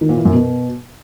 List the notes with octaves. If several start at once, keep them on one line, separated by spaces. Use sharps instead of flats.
D#3
A#2
E3
F#2
B2